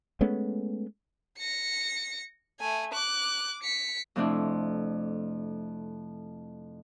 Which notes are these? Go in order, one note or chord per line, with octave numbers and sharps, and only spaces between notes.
G#3 A3 B3 C#4
A#6 C#7
A3 G#5
D6 F#6
B6 C#7
F2 C3 A3 C4 D4 E4